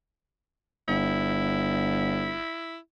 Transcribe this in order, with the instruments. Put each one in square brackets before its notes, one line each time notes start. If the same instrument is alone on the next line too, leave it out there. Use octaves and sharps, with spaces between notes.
[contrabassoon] G1 [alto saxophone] E4